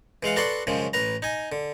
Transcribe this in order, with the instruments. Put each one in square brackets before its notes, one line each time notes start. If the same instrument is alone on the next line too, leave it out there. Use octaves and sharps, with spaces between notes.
[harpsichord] E3 G#3 F5 F#5
F#4 A4 B4 D5 F#5 C6
F#2 C#3 F3 G#3
A1 B4 A#5
D#4 G#5
D3